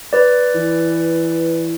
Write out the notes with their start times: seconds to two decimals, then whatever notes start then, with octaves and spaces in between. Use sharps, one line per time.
0.13 B4 D5
0.55 E3